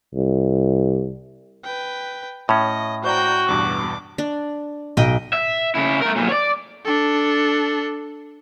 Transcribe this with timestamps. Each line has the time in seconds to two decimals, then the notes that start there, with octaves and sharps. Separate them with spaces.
0.15 C2
1.64 B4 G5
2.49 A2 C#4 D#5
3.04 F#4 C5 D5 G5 A#5 G6
3.49 E2 G2 B2 D6
4.18 D4
4.97 B1 D#5 G5
5.33 E5
5.75 C#3 E4
6.02 A3 A#4
6.17 B1 A#2
6.29 C#5 D5
6.85 D4 A4